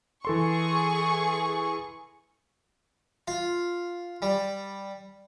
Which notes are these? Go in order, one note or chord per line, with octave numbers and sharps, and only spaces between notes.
E3 G#4 A4 C6 C#6
F4
G3